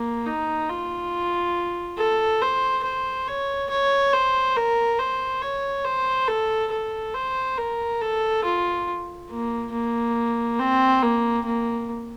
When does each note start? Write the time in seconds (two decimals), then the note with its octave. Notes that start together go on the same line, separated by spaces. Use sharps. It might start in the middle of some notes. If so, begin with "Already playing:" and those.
Already playing: A#3
0.26 D#4
0.70 F4
1.98 A4
2.42 C5
2.84 C5
3.28 C#5
3.70 C#5
4.14 C5
4.57 A#4
4.99 C5
5.42 C#5
5.85 C5
6.28 A4
6.71 A4
7.14 C5
7.58 A#4
8.01 A4
8.44 F4
9.31 A#3
9.72 A#3
10.59 C4
11.03 A#3
11.45 A#3